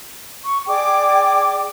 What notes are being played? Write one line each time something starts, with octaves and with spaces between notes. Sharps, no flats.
C#6
G#4 D5 G5 D6